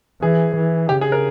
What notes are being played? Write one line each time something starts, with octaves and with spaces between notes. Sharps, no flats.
E3 G#4
E3
C#3 G4
G#4
A#4